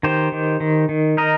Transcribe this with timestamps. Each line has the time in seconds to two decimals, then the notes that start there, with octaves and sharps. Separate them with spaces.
0.03 D#3 G4 C5
0.32 D#3
0.60 D#3
0.89 D#3
1.17 D#4 A#4 D#5